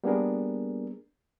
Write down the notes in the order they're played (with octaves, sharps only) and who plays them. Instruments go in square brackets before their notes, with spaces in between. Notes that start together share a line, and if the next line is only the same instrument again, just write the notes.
[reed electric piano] G3 A#3 B3 D4 G#4 A#4